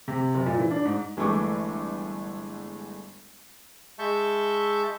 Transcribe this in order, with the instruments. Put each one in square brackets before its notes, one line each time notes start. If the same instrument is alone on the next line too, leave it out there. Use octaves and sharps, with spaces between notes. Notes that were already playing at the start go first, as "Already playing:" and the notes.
[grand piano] C3
F#1
A#2
E3
D4
G#2
[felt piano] G1 E3 G#3 A3 C#6 D6
[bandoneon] G#3 E5 A5 C#6 G6